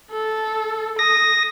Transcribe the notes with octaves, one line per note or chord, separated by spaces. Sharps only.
A4
D#6 A#6